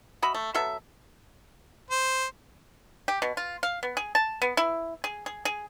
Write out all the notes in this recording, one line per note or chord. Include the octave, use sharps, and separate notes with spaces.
F#4 D#5 E5 B5
A3
F#3 B3 A4 E5
C5
G4
B2
F4
F5
B3
G#4
A5
B3
E4
G#4
G#4
G#4